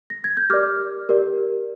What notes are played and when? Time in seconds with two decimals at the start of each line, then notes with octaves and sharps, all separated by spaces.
0.10 A#6
0.24 G#6
0.37 G6
0.50 G4 A#4 D5 D6 F6
1.09 G4 A#4 D5